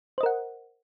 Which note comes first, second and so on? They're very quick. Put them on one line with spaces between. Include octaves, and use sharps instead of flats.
C5 D#5 A#4 F#5